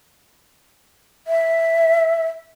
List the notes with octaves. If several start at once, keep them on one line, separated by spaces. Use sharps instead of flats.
E5